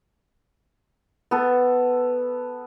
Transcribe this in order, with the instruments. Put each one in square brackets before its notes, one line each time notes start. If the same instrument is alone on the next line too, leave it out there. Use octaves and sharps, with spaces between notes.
[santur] B3 A4